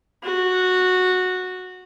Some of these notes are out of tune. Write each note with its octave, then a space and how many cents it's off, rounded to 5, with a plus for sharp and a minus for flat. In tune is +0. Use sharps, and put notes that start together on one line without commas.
F#4 -10